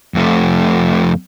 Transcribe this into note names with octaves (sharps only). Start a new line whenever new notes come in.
F2 A3